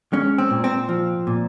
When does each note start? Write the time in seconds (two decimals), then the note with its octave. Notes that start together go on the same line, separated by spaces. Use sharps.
0.13 G#3 C#4
0.38 C4
0.50 A#2
0.64 C4
0.89 F3
1.27 A#2